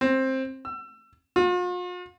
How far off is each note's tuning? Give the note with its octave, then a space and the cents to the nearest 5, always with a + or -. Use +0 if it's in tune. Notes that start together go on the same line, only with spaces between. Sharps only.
C4 +15
E6 +30
F4 +45